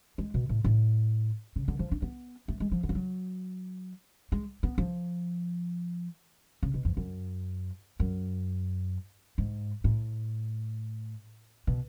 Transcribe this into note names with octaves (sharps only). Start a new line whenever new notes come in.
G#3
B2
A2
A2
C#3
D3
F3
D4
B3
A3
G#3
F3
D3
F3
F#3
G#3
B3
F3
C#3
B2
F2
F#2
F#2
G#2
A2
B2